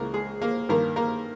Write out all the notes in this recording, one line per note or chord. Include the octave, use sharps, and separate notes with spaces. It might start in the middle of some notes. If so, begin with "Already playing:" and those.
Already playing: C#2 C#3 E3 A#3 A#4
G#3 G#4
A#3 A#4
G2 D#3 A#3 A#4
A#3 A#4